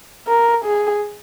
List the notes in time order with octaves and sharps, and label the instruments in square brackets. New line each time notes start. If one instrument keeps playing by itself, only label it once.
[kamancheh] A#4
G#4